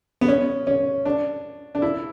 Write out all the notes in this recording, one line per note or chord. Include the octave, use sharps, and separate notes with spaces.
B3
C#4
C#4
D4
D4
E4